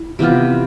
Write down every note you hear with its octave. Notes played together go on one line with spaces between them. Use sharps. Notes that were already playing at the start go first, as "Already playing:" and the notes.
Already playing: E4
C3 E3 B3 F4